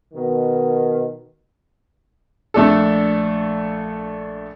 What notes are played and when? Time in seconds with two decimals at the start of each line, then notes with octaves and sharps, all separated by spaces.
0.13 B2 D#3
2.54 A#1 A3 D4 A4